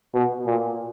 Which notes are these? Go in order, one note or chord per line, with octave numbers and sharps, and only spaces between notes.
B2
A#2